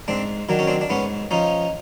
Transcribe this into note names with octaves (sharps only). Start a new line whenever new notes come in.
G#2 C4 D4
D#3 F#3 D4
C#4
C4 D4
D4
G#2 B3 C#4
F3 C#4 D#4